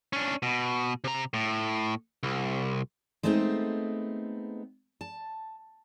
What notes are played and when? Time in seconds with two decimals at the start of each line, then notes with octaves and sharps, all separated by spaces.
0.13 C#4 D4
0.42 B2
1.04 C3 A#5
1.34 A2
2.23 C2
3.23 G#3 A3 B3 C4 D#4
5.01 A5